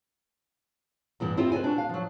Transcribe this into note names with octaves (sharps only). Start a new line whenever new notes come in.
E2 G2 E3 B3
C4 E4 F4 G4
B4 C5 D#5 G#5
D4 F#4
F5
F3 F#3